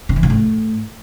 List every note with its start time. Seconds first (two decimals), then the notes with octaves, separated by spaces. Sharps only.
0.09 C#3
0.16 E3
0.23 A#2
0.30 A2